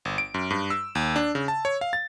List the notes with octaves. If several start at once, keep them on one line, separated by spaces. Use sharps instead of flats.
G1
D7
F#2
G2
E6
D#2
D4
C#3
A5
C#5
F5
A6